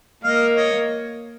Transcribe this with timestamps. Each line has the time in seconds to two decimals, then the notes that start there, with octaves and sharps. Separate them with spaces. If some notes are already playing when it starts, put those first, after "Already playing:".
0.24 A#3 D#5 F5
0.56 C#5 D#5